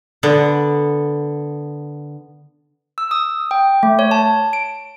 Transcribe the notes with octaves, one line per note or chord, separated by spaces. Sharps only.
D3 B3
E6
D#6
G5
A3
C#5
A5
D7